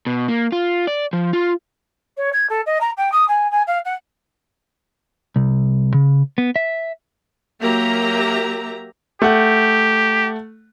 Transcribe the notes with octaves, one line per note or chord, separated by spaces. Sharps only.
B2
A#3
F4
D5
F3
F4
C#5
G#6
A4
D#5
A#5
G5
D#6
G#5
G#5
F5
F#5
C2
C#3
B3
E5
F#3 A#3 G4 E5 A#5
A3 G4 F#5